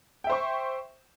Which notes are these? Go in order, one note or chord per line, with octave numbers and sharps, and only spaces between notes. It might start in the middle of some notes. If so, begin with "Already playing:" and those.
C5 E5 G5 C#6